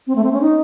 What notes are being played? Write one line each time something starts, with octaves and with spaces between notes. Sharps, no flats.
C4
A3
C4
C#4
D#4